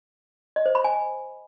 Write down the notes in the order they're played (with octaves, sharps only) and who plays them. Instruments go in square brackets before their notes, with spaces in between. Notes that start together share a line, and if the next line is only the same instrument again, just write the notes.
[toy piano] D#5
C5
B5
G#5